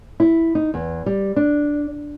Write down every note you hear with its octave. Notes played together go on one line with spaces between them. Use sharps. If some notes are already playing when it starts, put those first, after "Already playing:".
E4
D#4
E2
G3
D4